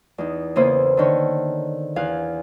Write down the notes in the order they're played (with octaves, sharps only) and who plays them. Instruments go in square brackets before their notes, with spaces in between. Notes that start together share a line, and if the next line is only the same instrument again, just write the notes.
[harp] E2 D#4
C#3 A#3 B3 E4 C5
D3 D#3 C#5
E2 F5 G#5 F#6